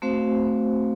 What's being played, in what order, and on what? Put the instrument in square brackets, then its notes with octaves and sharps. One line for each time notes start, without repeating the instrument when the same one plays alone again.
[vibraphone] A3 C4 F#4 C5 F5